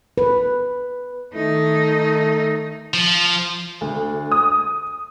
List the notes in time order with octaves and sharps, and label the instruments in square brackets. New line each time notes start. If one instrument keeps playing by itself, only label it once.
[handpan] B4
[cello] D#3 D#4 [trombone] A3
[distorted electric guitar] F3
[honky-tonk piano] D2
D#6